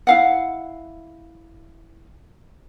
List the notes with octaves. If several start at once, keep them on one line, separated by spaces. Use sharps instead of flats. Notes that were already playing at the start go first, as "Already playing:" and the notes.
E4 F5 F#5